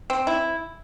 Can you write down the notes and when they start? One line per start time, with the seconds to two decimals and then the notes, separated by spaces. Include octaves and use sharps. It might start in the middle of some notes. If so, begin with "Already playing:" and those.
0.10 C4
0.27 E4